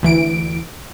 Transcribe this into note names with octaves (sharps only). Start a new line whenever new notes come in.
D2 E3 D7